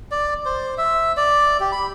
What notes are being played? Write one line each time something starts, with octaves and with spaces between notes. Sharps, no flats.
D5
C5
E5
D5
G4
B5